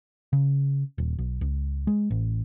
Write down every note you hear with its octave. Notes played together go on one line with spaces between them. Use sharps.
C#3
D#1
B1
C#2
G#3
A1